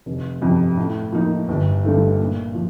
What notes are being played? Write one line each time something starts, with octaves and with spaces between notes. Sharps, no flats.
F1
F2 C3 F3
A2
F3 A#3 D#4
G1
G2 D3 A3 D#4
A#2
F3